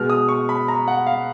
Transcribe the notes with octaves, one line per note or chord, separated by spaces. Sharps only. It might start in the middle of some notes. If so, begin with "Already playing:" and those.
Already playing: B2 G#3 F6
D#6
C#6
B5
A#5
F#5
F5